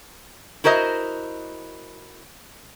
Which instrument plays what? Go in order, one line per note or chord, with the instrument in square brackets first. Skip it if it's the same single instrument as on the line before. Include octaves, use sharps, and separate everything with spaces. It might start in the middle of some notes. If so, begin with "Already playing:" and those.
[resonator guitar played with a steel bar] E4 F#4 A#4 C5 D#5